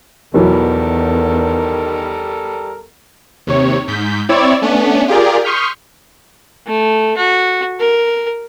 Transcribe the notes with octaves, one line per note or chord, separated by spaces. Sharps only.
E2 B2 D#3 E3 F#3 G3 A4 A#4
D#2 C3 C#5
G#2 G6 B6
C4 E4 C#5 D5 E6 G#6
A3 B3 C#4 D4
F4 G4 G#4 A#4 D5
C6 C#6 D#6 F6 G6 B6
A3
F#4
A#4